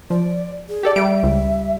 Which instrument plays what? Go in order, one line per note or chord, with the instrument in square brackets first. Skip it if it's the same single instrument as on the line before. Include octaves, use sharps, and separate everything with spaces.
[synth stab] F3 [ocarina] D5
[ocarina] G#4
[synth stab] G4 A4 D5
[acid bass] G3 [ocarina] E5 [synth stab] D7
[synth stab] C#2